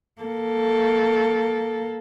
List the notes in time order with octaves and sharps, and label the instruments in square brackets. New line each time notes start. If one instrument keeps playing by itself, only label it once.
[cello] A#3 A4